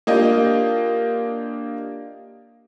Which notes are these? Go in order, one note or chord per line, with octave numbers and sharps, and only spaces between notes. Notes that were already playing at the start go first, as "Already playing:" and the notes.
A#3 D4 F4 G4 D#5